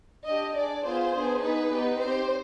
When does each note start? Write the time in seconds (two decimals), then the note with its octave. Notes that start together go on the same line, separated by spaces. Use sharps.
0.24 D4 G4 D#5
0.53 D4 G#4 D5
0.82 B3 F4 G#4 C5
1.12 B3 D4 G#4
1.41 B3 D#4 G#4 B4
1.70 B3 D#4 G4
1.99 C4 G4 C5